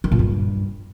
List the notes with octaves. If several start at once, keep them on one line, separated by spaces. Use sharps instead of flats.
D#3
A#2
G2